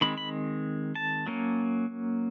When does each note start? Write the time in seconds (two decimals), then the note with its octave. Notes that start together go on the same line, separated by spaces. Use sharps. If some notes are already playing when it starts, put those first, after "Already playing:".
0.01 D#3 G#3 C4 B5
0.18 B5
0.95 A5
1.27 F#3 A#3 C#4